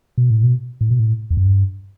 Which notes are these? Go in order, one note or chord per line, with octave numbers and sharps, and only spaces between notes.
B2
A2
B2
A2
B2
A2
E2
F#2
G2